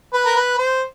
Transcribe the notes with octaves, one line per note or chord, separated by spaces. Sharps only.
B4
A#4
B4
C5